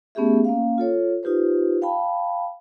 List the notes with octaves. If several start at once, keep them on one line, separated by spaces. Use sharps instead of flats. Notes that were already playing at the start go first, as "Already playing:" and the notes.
A3 B3 C#4 G4 G#4 E5
A#3 C#4 F5
F4 A4 C#5
D#4 F4 G4 B4 C5
F5 G5 A5 B5